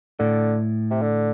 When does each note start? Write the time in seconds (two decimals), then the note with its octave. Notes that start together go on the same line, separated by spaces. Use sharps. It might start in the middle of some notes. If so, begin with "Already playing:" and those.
0.19 A2 D3
0.91 C3
1.02 D3